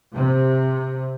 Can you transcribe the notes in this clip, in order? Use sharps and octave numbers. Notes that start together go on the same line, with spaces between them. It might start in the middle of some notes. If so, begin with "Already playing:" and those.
C3